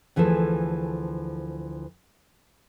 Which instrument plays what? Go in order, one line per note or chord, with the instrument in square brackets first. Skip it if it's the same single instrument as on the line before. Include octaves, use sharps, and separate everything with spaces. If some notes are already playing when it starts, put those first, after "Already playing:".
[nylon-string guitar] D2 E3 F3 G#4 A4